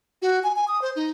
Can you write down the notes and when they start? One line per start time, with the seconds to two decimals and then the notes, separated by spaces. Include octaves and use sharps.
0.22 F#4
0.43 G#5
0.56 G#5
0.68 D#6
0.82 C5
0.96 D#4